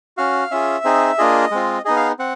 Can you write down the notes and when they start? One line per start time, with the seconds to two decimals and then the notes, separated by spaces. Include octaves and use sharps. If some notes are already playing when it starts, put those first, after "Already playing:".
0.17 C#4 F#4 F5
0.51 C#4 F4 G#4 E5
0.84 C4 D#4 G#4
1.18 A#3 D4 F4 G#4 D#5
1.51 G#3 C4 F4
1.85 B3 D#4 G#4 D#5
1.96 F5
2.19 C4 F#5